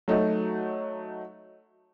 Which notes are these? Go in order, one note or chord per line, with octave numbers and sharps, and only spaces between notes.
F#3 A3 D#4